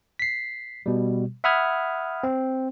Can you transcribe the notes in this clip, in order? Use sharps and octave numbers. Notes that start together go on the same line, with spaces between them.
B6 C7
B2 G3
E5 F#5 B5 D#6 F6 G#6
C4